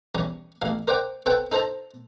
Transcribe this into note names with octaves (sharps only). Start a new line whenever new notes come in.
E2 G3 C#4
A1 E2 F5
A#4 C5 D5 F#5 G5
C4 A4 B4 F#5 G5 A5
D#4 A4 C5 A5 A#5